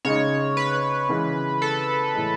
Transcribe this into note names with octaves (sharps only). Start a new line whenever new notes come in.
C#3 G#3 D#4 C#5
B4
C#3 E3 G#3
A4
A2 E3 G#3